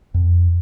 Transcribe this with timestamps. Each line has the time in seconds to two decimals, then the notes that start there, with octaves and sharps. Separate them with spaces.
0.14 F2